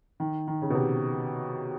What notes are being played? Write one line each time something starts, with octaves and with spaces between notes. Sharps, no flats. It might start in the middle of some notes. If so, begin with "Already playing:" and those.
D#3
D#3
C#3
B2
C3